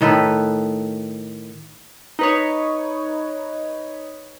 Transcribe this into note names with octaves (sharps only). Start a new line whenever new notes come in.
A2 D#3 A4 B4
D#4 B4 C#5